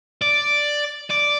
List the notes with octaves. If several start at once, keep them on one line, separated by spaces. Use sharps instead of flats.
D5
D5